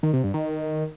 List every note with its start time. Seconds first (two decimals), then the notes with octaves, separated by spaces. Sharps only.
0.03 D#3
0.13 C3
0.24 G2
0.34 D#3